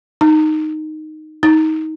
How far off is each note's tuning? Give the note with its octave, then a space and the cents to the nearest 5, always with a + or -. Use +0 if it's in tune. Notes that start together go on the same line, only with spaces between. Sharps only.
D#4 -5
D#4 +20